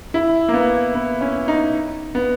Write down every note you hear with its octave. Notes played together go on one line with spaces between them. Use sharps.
E4
A#3
B3
B3
C#4
D#4
B3